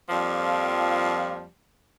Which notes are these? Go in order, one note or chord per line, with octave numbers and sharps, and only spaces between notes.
F2 F3 G3 A#3